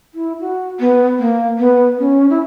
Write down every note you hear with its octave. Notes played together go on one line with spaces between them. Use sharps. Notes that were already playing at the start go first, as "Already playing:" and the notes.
E4
F#4
B3
A#3
B3
C#4
E4